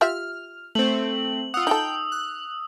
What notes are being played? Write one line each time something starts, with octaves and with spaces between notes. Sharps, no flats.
F4 G4 E5 F6
A3 C4 F#7
F4 F#5 D#6 E6
D#4 A4 G5 G6
F#6